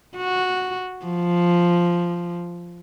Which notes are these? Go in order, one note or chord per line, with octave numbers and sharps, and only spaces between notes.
F#4
F3